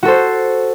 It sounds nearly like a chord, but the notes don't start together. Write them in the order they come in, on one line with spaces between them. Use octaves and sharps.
F#4 A4 C5